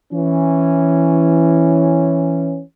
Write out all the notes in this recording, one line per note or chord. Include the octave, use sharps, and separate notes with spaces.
E3 C#4